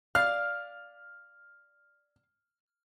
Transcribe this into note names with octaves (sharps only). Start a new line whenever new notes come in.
D5 F5 F6